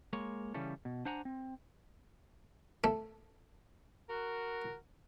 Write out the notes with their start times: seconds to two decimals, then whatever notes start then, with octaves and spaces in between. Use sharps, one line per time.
0.13 G#3 A#3 C#5
0.54 C#3 E3 G3 C#4 A4
0.85 B2
1.05 D4 C5 F#5 G#5 A#5
1.25 C4
2.84 A3
4.09 F#4 A#4